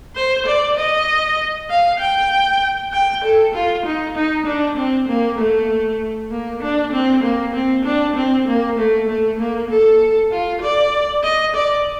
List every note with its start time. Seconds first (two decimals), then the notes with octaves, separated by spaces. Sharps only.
0.16 C5
0.46 D5
0.77 D#5
1.70 F5
2.00 G5
2.92 G5
3.24 A4
3.54 F4
3.86 D#4
4.16 D#4
4.46 D4
4.77 C4
5.08 A#3
5.39 A3
6.31 A#3
6.63 D4
6.92 C4
7.23 A#3
7.55 C4
7.85 D4
8.16 C4
8.47 A#3
8.78 A3
9.09 A3
9.39 A#3
9.70 A4
10.31 F4
10.62 D5
11.23 D#5
11.55 D5